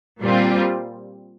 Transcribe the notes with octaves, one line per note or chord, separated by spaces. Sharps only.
A#2 G3 C4 F4